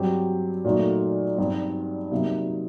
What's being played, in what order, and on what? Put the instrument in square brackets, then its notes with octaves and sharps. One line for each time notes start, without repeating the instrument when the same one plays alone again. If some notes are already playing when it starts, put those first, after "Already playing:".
Already playing: [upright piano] G2 F#3 C4 G4
A#2 F#3 A3 D#4 F#4
G2 F#3 C4 D#4
C3 F#3 A#3 D#4